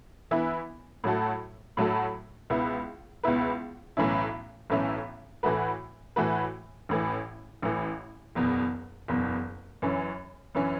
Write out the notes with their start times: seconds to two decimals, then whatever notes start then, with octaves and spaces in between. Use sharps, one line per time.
0.31 E3 B3 E4 B4
1.04 A2 F#3 A3 F#4 A4
1.77 A2 F#3 A3 F#4 A4
2.50 C#2 B2 B3 E4 B4
3.23 C#2 B2 B3 E4 B4
3.97 B1 A2 E3 C#4 E4
4.70 B1 A2 E3 C#4 E4
5.43 A2 E3 A3 F#4 B4
6.16 A2 E3 A3 F#4 B4
6.89 A1 A2 E3
7.62 A1 A2 E3
8.35 F#1 E2 B2
9.08 F#1 E2 B2
9.82 F#2 E3 C#4
10.55 F#2 E3 C#4